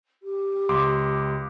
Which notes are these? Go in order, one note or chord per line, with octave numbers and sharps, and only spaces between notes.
G4
C#2 C6 D6